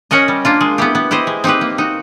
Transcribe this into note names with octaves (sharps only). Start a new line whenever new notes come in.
C#4 F#4 A#4 D#5
G3
A#3 D4 F4
G#3
B3 E4 G4
B3
E4 G4 C5 D#5
G#3
C4 D#4 G4 B4
A#3
D#4 F#4